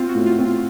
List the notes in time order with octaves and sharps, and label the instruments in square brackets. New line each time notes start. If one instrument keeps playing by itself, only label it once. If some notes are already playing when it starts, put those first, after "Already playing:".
Already playing: [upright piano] C4 [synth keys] F4
[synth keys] F#4
[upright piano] A2
[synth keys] F4
[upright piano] C4
[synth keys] F4